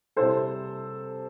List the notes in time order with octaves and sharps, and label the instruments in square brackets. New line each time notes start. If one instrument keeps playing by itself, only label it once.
[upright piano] C3 G3 C4 E4 A4 C5